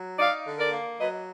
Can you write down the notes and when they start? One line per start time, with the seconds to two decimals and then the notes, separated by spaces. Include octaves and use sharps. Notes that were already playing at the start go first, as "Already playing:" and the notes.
Already playing: F#3
0.19 D#4 D5 F5
0.46 D3
0.59 A#4 D5
0.72 A#3
0.99 F#3 B4 D#5